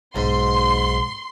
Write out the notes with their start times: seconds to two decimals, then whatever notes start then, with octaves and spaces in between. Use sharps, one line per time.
0.16 B1 G#2 C6